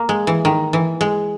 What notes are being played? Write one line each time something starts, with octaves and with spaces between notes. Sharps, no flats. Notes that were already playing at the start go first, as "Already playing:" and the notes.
Already playing: A#3
G#3
E3
D#3
E3
G#3